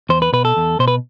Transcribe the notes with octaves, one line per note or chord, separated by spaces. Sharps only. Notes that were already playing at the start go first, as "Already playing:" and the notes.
E2 C5
B4
B2 B4
A4
E2
B2 C5
B4